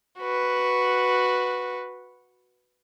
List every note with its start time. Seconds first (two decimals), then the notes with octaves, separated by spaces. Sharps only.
0.19 F#4 B4